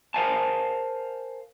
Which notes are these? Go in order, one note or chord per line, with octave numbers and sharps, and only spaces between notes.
A#4 C5 D5 F5 G#5 A5